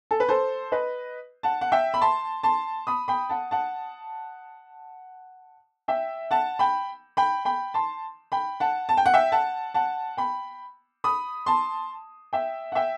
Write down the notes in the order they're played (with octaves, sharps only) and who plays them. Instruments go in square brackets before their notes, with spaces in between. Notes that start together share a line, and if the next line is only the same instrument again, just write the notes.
[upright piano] A4
B4
A4 C5
B4 D#5
F#5 A5
F#5
E5 G5
B5
A5 C6
A5 C6
B5 D#6
G5 B5
F#5 A5
F#5 A5
E5 G5
F#5 A5
G5 B5
G5 B5
G5 B5
A5 C6
G5 B5
F#5 A5
A5
G5
F#5
E5 G5
F#5 A5
F#5 A5
G5 B5
B5 D#6
A5 C6
E5 G5
F#5
E5 G5